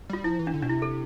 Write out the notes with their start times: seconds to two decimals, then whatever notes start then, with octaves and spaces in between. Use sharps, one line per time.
0.10 G3 F4
0.24 F3 E4
0.39 E3
0.47 D4
0.53 D3
0.62 B2 D4
0.69 C3 E4
0.82 A4